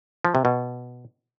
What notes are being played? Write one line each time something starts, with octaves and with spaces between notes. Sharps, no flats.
F3
C3
B2